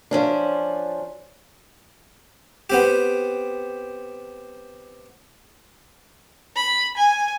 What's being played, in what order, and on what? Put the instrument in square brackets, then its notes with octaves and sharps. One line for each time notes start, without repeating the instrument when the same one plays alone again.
[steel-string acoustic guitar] F3 C#4 D4
[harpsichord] B3 C4 G4
[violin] B5
G#5